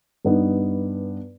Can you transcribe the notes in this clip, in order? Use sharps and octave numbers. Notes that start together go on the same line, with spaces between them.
G2 B3 D#4